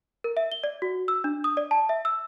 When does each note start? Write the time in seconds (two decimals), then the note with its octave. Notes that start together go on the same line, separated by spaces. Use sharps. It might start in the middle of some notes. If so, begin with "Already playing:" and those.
0.24 A#4
0.37 E5
0.52 G7
0.63 D5
0.82 F#4
1.08 E6
1.24 D4
1.44 D#6
1.57 D5
1.71 A5
1.89 E5
2.05 E6